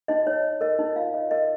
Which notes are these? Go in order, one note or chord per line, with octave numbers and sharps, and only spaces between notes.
D#4 D#5
D#4 C#5
C#5
A#4 D#5
D#4
F4 F5
C#5 D#5
A#4 D#5